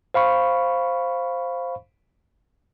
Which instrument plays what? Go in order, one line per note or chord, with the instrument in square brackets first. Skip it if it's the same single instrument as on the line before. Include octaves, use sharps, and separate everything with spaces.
[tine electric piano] C5 F5 B5 C#6